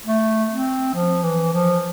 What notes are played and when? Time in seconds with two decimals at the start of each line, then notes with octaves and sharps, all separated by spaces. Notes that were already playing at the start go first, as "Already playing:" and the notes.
0.06 A3
0.51 C4
0.94 F3
1.23 E3
1.53 F3